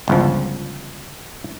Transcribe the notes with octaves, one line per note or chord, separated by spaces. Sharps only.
G1 C#2 F3